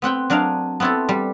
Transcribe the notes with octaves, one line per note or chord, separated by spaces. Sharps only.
B3 C4 F#5 G5
F#3 D4 A#4 D#5 F5
B3 C4 E4 F#4 A4
G3